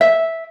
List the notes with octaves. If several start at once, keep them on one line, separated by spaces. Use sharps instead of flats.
E5